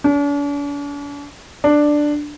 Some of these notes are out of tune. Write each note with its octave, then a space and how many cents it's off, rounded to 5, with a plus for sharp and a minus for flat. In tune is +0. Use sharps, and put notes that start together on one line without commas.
D4 -45
D4 +5